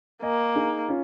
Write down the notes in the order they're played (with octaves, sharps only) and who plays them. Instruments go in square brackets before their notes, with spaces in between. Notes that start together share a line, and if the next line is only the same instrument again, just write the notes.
[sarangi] A#3 [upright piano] D#5 G#5
[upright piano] D#4 G#4
C#4 F4